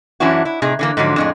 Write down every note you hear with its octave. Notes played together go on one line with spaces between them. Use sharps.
F#2 E3 C#4 D4 E4 F#4
E4
A2 C3 D#4 G#4
D3 E3 A#3
G#2 D3 F3 F#3
F2 A2 G#3